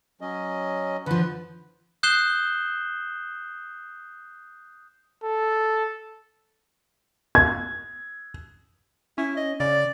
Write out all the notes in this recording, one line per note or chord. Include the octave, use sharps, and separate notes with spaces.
F#3 C#4 D#5
D3 F3 B4
D#6 F#6 G6 C7 E7 G7
A4
G#6
C#4 E4
D#5
C#3 D5